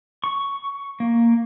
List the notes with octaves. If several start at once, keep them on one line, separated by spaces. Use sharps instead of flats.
C#6
A#3